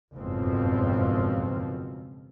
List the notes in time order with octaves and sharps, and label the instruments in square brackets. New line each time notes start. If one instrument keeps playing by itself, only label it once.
[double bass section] F#1 F2 G#2 B2 F3 C4